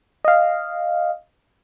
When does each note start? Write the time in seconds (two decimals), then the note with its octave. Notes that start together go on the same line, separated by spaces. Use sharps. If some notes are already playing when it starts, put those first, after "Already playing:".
0.25 D#5 F5